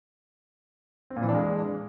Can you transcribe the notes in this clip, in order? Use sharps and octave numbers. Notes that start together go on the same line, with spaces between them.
C4
A#2
E3
D4
G#3